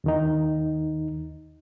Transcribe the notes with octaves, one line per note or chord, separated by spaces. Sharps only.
D#2 D#3 D#4